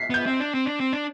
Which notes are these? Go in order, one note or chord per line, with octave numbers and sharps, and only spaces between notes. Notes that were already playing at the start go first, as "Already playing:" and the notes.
Already playing: B6 C7
B3 G6
C4
D4
C4
D4
C4
D4